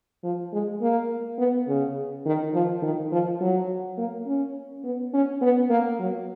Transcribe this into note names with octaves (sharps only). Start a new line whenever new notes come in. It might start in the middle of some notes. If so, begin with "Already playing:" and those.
F3
G#3
A#3
B3
C#3
D#3
F3
D#3
F3
F#3
A#3
C#4
B3
C#4
B3
A#3
F#3